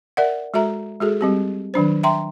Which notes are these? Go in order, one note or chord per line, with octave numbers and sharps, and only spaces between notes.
A#4 D5 E5 F#5
G#3 F#4 A4 E5 A#5
G#3 F#4 G#4 A4
G3 C4 G4
D#3 F#3 D4 C5
E5 G5 A#5 C6